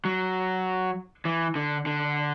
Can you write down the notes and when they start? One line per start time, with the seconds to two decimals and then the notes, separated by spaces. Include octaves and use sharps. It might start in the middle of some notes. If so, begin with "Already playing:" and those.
0.05 F#3
1.25 E3
1.55 D3
1.86 D3